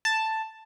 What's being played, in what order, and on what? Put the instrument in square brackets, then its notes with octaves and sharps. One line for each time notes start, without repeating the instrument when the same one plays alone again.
[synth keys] A5